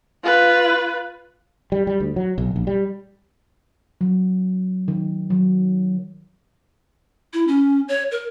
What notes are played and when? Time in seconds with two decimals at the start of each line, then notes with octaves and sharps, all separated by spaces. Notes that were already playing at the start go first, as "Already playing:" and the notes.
0.24 F4 B4
1.72 G3
1.87 G3
2.00 D2
2.16 F#3
2.38 B1
2.56 A#1
2.67 G3
4.01 F#3
4.88 D#3
5.30 F#3
7.33 E4
7.47 C#4
7.88 C#5
8.11 A#4